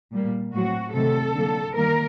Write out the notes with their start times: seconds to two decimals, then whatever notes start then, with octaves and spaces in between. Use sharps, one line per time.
0.12 A#2 G3 A#3
0.53 A2 F#3 C4 F#4
0.94 C3 D#3 F#3 A3 A4
1.35 D3 F#3 A#3
1.76 D#3 G3 A#3 A#4